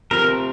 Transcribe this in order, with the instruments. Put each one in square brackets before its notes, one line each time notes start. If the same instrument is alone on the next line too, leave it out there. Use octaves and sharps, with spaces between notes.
[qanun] C3 F3 A3 [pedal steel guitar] A#4